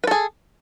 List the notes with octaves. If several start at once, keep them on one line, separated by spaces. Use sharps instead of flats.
G#4 A4 B4